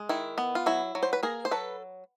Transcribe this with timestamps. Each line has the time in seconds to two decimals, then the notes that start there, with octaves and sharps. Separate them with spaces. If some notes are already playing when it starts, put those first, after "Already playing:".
Already playing: G#3
0.09 D#3 E4
0.38 B3
0.55 F4
0.66 F#3 E4
0.95 F#3
1.03 C5
1.13 B4
1.23 A#3 G#4 A#4
1.45 C5
1.51 F#3 A4 B4